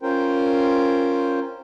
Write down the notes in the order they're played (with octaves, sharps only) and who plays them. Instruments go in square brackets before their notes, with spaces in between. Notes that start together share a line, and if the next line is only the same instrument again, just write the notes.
[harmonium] C#4 F4 A#4 C5 G5